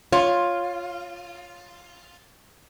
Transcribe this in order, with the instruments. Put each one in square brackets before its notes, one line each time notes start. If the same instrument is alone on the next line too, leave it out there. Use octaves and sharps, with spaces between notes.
[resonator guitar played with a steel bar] F4 [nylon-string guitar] C#5